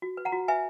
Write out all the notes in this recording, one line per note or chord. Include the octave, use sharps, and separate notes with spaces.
F#4
B4
F#5 A#5
F#4
B4 E5 G#5